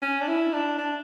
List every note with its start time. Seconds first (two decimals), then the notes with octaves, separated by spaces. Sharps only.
0.02 C#4
0.21 D4
0.28 E4
0.53 D4
0.78 D4